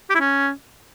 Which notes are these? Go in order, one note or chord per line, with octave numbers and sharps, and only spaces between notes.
G4
E4
C#4